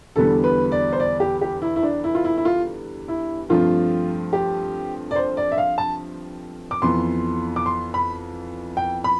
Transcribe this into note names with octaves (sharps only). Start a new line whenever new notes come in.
E2 D3 G3 B3 A4
B4
D5
C5
D5
G4
G4
E4
E4
D4
E4
F4
E4
E4
F4
E4
G2 F3 A3 C4 F4
G4
D5
C5
D5
E5
F5
A5
D6
F2 E3 B3 C6
D6
C6
B5
G5
B5